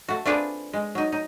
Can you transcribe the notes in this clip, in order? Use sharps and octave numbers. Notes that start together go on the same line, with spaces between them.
A3 F#4
A3 C4 D4 F4 G#4 B4
G#3
F#3 D#4
D#4